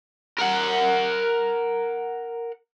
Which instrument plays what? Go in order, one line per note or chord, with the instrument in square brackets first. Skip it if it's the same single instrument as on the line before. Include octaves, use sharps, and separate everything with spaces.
[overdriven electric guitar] A#4 F#5